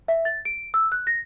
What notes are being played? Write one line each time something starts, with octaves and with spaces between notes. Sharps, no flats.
E5
A6
D7
E6
F#6
A#6